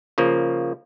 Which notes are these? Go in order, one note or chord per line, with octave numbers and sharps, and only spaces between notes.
C#3 F3 A#3